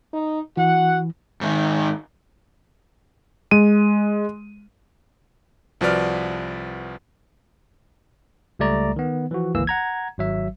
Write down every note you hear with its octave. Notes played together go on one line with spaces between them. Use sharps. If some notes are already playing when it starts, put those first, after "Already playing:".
D#4
E3 F#4 F#5
G#2 D#3
G#3 D#7
C2 F3 F#4 B4 D5 F6
C#2 G3 A3 D5 A#5
D#3 B3
E3 F3 F#4
G1 C#2 E3 A#3 E6
F#5 A#5 G#6
G#1 F#3 E5